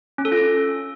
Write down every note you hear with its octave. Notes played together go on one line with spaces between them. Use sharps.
C#4
A4
F4